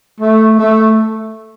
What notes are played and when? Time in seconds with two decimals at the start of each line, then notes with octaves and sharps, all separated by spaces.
0.20 A3
0.59 A3